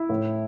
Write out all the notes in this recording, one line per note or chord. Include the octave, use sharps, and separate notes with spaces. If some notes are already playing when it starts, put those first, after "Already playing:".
Already playing: E4
A2